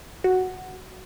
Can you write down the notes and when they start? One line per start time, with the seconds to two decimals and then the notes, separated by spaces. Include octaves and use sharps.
0.24 F#4